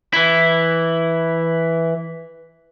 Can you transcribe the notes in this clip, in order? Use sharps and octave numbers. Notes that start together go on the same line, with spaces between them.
E3 E4